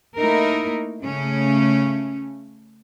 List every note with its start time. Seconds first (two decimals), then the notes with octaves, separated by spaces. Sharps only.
0.17 A3 A#3 D#4 E4 A#4
1.02 C#3 A3 C#4